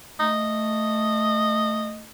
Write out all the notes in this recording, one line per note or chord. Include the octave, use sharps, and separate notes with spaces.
A3 D#5